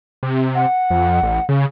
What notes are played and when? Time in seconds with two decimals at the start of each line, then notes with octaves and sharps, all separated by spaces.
0.23 C3
0.55 F#5
0.90 F2
1.23 A1
1.49 C#3